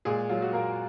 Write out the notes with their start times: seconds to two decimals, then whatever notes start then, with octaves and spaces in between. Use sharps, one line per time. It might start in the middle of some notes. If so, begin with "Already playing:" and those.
0.05 A#2 G#3 G#4
0.29 F#3 F4
0.42 F#4
0.53 A#2 A#3 A#4